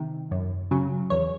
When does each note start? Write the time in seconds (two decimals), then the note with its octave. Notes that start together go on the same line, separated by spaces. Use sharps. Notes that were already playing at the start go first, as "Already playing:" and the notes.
Already playing: C3 D#3
0.31 F#2
0.71 C#3 F#3
1.10 E2 C#5